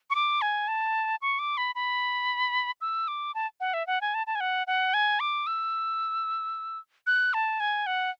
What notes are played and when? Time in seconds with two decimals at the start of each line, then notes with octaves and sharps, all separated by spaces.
0.10 C#6
0.15 D6
0.42 G#5
0.68 A5
1.22 C#6
1.39 D6
1.57 B5
1.75 B5
2.81 E6
3.08 D6
3.35 A5
3.60 F#5
3.74 E5
3.87 F#5
4.01 G#5
4.14 A5
4.27 A5
4.35 G#5
4.40 F#5
4.67 F#5
4.94 G#5
5.20 D6
5.47 E6
7.07 F#6
7.34 A5
7.60 G#5
7.87 F#5